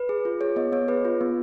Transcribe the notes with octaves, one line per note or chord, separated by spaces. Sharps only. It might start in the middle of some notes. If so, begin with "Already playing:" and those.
Already playing: B4
G#4
F4
G#4 C#5
B3 D#5
B3 C#5
G#4 B4
F4
B3